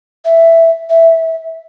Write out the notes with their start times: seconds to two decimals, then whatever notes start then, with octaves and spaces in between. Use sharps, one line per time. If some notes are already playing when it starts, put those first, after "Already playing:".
0.25 E5
0.90 E5